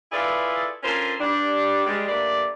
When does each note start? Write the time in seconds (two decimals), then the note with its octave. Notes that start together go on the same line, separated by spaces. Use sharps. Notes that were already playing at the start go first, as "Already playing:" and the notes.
0.12 E4 F4 G#4 A4 B4 D5
0.83 C#4 D4 F4 A4 A#4 C5
1.20 G2 G3 D4
1.86 G3 G#3
2.08 G2 A3 A#3 D5